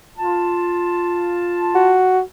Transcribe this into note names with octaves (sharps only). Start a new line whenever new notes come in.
F4 A5
F#4